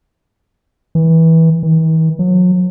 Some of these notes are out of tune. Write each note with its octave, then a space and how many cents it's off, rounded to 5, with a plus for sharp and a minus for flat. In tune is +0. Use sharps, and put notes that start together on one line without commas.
E3 -20
E3 -45
F#3 -35